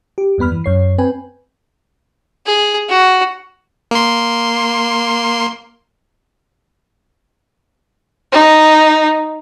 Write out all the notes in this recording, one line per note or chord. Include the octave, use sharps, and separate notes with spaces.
G4
E2 G2 B3 B5 F6
E3
F#2 C#5 C7
C4 B4 G5 G#5
G#4
F#4
A#3 C6
D#4